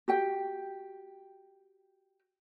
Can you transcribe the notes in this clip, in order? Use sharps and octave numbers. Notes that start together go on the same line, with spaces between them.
F#4 G4 G5